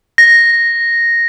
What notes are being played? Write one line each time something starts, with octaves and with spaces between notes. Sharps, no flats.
A#6